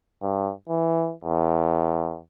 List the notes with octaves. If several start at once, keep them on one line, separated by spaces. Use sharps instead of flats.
G2
E3
E2